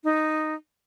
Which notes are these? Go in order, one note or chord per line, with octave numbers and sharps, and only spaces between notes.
D#4